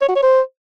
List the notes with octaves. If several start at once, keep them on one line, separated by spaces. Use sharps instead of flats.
C#5
F#4
C#5
C5